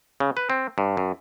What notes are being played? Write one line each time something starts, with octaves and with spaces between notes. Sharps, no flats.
C#3
B4
C4
G2
F#2